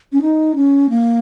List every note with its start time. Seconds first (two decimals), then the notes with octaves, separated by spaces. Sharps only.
0.12 C#4
0.22 D#4
0.56 C#4
0.90 A#3